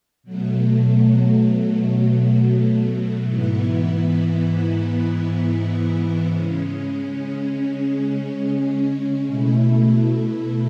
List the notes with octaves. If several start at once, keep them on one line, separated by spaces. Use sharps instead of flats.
B2 F#3 A3
G#2 E3 B3 E4
C#3 G#3 C#4
B2 A3 E4